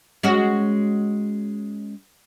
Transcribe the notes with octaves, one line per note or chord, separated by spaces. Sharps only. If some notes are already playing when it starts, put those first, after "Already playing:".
G#3 C#4 F#4